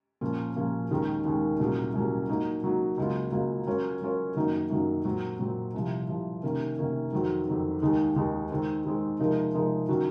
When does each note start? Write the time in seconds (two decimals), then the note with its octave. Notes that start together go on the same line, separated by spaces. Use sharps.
0.21 A#2 F3 A#3 C#4 F4
0.56 A#2 F3 A#3 C#4 F4
0.91 D#2 D#3 G#3 C#4
1.25 D#2 D#3 G#3 C#4
1.59 C2 A#2 F#3 C#4 G#4
1.94 C2 A#2 F#3 C#4 G#4
2.29 F#3 A#3 D#4 F#4
2.64 F#3 A#3 D#4 F#4
2.98 C#2 C#3 F#3 A#3 F4
3.32 C#2 C#3 F#3 A#3 F4
3.67 F#3 C#4 F4 A#4 C#5
4.01 F#3 C#4 F4 A#4 C#5
4.36 F#2 D#3 F#3 A#3 D#4
4.70 F#2 D#3 F#3 A#3 D#4
5.04 A#2 F#3 C4
5.39 A#2 F#3 C4
5.74 C2 C3 F3
6.09 C2 C3 F3
6.43 C3 D#3 A#3 C#4
6.77 C3 D#3 A#3 C#4
7.12 F2 D#3 F#3 C4 F#4
7.47 F2 D#3 F#3 C4 F#4
7.82 D#2 D#3 G#3 D#4 G#4
8.16 D#2 D#3 G#3 D#4 G#4
8.50 D#3 G#3 C4
8.85 D#3 G#3 C4
9.19 C3 F3 G#3 D#4 A#4
9.54 C3 F3 G#3 D#4 A#4
9.88 D#3 F#3 C#4 F#4